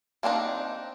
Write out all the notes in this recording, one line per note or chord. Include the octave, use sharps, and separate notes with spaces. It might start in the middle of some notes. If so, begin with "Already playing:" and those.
A#3 C4 D4 D#4